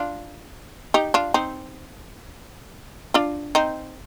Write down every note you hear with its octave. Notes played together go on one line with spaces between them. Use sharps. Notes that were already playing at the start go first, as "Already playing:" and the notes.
Already playing: D4 F4
D#4 G4
D4 F4
C4 D#4
D4 F4
C4 D#4